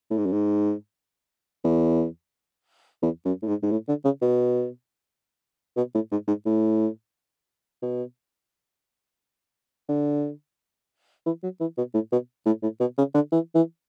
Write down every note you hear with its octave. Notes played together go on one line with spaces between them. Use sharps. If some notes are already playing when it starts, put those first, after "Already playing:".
A2
G#2
F#2
G#2
E2
E2
F#2
A2
G#2
G#2
A2
D3
C#3
B2
B2
A2
G#2
G#2
A2
B2
D3
E3
F#3
E3
B2
A2
B2
A2
A2
B2
C#3
D3
E3
E3